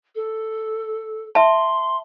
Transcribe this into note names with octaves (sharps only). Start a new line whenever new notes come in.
A4
E5 A5 C6